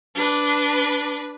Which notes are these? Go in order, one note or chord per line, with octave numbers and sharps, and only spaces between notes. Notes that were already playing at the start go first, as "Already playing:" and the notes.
D4 B4